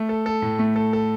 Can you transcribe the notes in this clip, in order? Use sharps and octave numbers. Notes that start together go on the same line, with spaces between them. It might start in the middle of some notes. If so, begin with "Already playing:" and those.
Already playing: A3
A4
A4
A2
A3
A4
A4